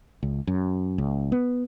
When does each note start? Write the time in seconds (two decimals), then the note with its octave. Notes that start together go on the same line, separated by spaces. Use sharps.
0.23 C#2
0.47 F#2
0.98 C#2
1.32 B3